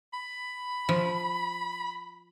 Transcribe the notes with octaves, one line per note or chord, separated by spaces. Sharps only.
B5
F3